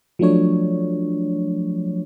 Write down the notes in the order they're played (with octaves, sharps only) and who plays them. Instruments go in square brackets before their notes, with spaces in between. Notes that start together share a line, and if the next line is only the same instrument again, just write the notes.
[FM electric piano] F3 F#3 A3 D4 C#5